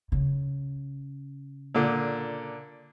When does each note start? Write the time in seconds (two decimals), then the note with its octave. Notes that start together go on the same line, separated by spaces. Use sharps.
0.12 C#3
1.75 A#2 D3